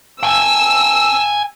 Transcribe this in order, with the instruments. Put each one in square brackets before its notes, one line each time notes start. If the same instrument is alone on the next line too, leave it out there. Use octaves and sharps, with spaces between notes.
[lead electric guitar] G5 G#5 [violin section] E6